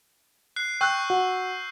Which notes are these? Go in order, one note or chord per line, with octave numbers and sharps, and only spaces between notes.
F#6 C7
G5 C#6 E6 F#6 G6
F#4 F#5